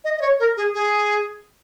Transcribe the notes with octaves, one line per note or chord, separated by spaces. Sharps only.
D#5
D#5
C#5
A#4
G#4
G#4